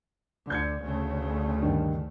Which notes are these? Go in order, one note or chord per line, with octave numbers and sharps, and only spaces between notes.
D2 D3 G6 G#6 C#7
D2 C#3 A3
G2 D3 D#3